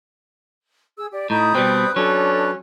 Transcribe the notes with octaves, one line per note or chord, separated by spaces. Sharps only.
G#4 E6
G4 D5
A2 D#4 B5 D#6 G6
B2 G3 C4 B4
F#3 C#4 D4 A4